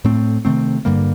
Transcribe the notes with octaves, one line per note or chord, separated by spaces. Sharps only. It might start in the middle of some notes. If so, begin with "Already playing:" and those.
A2 A3 C4
C3 D#3 A3 C4
G2 D3 G3 A#3